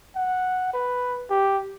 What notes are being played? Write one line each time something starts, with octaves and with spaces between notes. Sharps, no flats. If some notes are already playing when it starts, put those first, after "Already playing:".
F#5
B4
G4